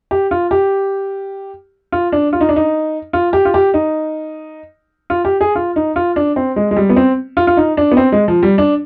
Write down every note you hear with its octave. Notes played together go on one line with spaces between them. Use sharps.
G4
F4
G4
F4
D4
F4
D#4
D4
D#4
F4
G4
F4
G4
D#4
F4
G4
G#4
F4
D#4
F4
D4
C4
G#3
G#3
G3
B3
C4
F4
F4
D#4
D4
B3
C4
G#3
F3
G3
D4